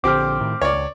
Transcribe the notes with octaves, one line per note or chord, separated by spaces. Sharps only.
A#1 D3 C4 G4 D6 F6
A2 D#3
C#2 C#5 D5